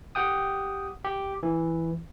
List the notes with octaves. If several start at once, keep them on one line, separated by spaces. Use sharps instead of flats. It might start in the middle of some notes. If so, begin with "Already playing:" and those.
G4 F#5 G5 D#6
G4
E3